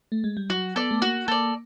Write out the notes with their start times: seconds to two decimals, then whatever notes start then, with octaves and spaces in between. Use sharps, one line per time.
0.12 A3
0.24 G#3
0.37 G3
0.50 F#3 F#4
0.76 B3 A4 D5
0.91 A3
1.02 A#3 F#4
1.28 A#3 A4 D5